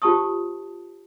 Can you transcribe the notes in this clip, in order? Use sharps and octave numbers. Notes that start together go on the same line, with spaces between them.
F4 G4 C5 A5 C#6 D#6